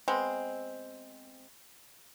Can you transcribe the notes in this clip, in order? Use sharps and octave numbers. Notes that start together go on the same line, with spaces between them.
G#3 B3 C4